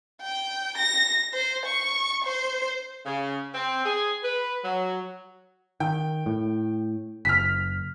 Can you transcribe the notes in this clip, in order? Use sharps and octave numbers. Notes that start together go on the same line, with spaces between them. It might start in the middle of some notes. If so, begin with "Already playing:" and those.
G5
A#6
C5
C#6
C5
C#3
C4
G#4
B4
F#3
D#3 G5
A2
F#1 F6 B6